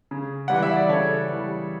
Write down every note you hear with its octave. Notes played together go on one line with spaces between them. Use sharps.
C#3
E3 G3 F#5
E5
D5
C#3 A4 C#5
E3 G3